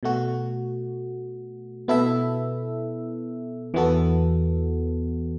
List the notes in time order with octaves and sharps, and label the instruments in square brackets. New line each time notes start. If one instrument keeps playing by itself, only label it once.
[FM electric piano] B2 A3 F#4
B2 B3 E4 A4 E5
E2 E3 B3 F#4 A4